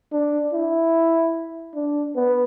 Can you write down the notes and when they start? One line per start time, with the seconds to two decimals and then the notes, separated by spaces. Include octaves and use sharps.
0.13 D4
0.54 E4
1.75 D4
2.16 B3